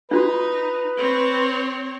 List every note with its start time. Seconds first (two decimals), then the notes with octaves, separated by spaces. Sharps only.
0.11 D4 D#4 F4 F#4 B4
0.98 C4 C#5